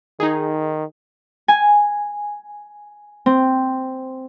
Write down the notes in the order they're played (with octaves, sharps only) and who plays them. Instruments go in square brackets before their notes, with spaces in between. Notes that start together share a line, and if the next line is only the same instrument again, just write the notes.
[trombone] D#3 [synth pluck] D#4 G#4
[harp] G#5
C4